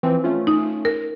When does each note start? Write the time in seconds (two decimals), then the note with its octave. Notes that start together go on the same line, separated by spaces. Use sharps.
0.03 E3 F3 C4
0.24 A3 C#4 F4
0.47 D#4
0.85 A#4